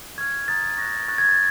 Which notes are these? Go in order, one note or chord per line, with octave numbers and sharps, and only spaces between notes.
C#6 F6 G#6
A#5 D#6 F#6 A6
C#6 F#6 A#6
A6
C#6 F#6 A6
G#6
A6